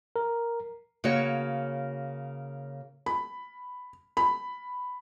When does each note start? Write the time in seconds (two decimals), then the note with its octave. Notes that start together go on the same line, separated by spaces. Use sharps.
0.16 A#4
1.04 C#3 A#3 F#4 C#5
3.06 B5
4.17 B5